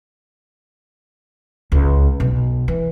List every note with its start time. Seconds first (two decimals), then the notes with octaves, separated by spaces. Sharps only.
1.72 C#2
2.20 B1
2.68 E3